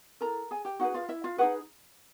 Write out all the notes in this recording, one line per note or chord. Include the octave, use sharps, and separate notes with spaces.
E4 A4 A#4 A#5
G#4 G#5
G4 G5
D#4 F#4 G#4 B4 F#5
F4 F5
E4 E5
F4 F5
D#4 F#4 G#4 B4 F#5